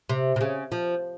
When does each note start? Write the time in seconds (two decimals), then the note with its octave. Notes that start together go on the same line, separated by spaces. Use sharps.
0.09 C3
0.36 C3
0.41 C#3
0.72 F3